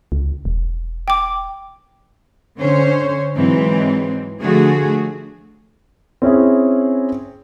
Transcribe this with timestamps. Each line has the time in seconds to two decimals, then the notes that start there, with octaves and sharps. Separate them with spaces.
0.12 C#2
0.45 E1
1.08 G5 D6
2.59 D3 C#4 C5 C#5
3.36 G#2 E3 F#3 G#3 C4
4.41 D3 F3 A3 F#4 G#4
6.22 C4 C#4 E4 G#4